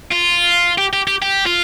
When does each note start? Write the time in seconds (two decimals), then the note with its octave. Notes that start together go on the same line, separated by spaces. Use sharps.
0.11 F4
0.78 G4
0.93 G4
1.07 G4
1.22 G4
1.46 F4